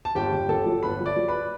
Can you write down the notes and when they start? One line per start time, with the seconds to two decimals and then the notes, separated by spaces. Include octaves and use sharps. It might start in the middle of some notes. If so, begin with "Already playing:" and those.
0.05 A5
0.15 G1 G4 G5
0.33 G1
0.49 G1 A4 A5
0.66 F#3
0.83 G1 B4 B5
1.00 F#3
1.06 D5 D6
1.16 F#3
1.28 B4 B5